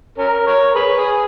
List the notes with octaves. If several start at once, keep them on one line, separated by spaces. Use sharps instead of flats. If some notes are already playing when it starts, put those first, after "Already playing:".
C#4 A#4
A#4 C#5
G#4 B4
G#4